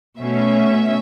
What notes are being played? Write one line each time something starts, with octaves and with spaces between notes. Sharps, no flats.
B2 A3 C#4 E5